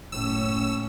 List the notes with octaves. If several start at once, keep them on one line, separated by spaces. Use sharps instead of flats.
F#1 A2 C#4 E6